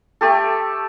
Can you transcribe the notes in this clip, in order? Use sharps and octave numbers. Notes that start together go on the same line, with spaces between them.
A3 G4 A4